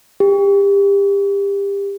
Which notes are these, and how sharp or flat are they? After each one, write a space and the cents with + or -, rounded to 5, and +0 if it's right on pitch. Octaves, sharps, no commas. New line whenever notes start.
G4 +30